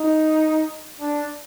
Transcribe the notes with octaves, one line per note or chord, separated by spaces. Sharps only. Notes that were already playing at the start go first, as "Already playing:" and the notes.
Already playing: D#4
D4